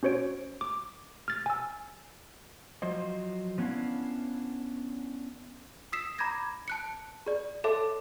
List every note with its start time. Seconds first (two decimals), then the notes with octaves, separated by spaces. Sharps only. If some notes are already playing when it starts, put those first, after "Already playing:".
0.03 C#4 F#4 C5 C#5 D7
0.61 D6
1.28 F6 A6
1.46 G#5 E6
2.82 F3 F#3 C5 D#5
3.58 F3 B3 C#4 D4 E4 F5
5.92 D#6 E6 B6 C7 E7
6.19 A#5 B5 D6 G6 G#6 A#6
6.68 A5 F#6 C#7
7.26 G#4 D5
7.64 A4 C#5 E5 A5 C6 D6